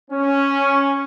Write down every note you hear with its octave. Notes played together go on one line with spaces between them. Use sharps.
C#4